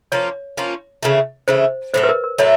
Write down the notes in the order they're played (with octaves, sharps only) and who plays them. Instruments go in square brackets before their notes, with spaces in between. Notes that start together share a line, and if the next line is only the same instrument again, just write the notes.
[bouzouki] F3 A#3 C#4 F4 [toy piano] C#5
[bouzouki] F3 A#3 C#4 F4
C#3 E3 A3
[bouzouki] C#3 E3 A3 [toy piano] C5
[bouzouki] A2 F#3 A3 [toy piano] C5
[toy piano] B4
A#4
A#4
[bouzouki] A2 F#3 A3 [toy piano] C#5